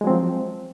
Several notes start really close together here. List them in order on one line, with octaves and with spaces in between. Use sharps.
G#3 F#3 C4 F3